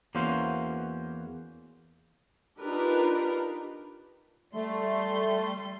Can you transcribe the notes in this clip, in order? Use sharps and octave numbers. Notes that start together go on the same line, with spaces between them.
E2 A#3 C#4 F#4 C5 F5
D4 D#4 F4 G4 A#4 B4
G3 A3 C6